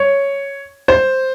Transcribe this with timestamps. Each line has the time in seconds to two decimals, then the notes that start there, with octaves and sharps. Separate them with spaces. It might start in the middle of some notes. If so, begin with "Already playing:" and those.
Already playing: C#5
0.88 C5